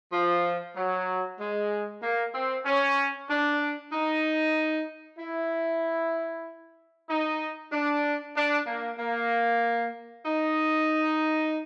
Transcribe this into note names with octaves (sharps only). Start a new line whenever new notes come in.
F3
F#3
G#3
A#3
C4
C#4
D4
D#4
E4
D#4
D4
D4
A#3
A#3
D#4